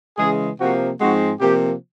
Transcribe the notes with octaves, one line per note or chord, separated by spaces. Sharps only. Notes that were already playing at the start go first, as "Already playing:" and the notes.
C#3 E3 G#3 G#4
C3 F3 A#3 F#4
G#2 F3 G#3 C4 F#4
C3 F3 A#3 G4